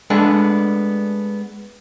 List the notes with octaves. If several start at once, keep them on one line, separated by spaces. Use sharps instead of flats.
G#3 A3 B3 D4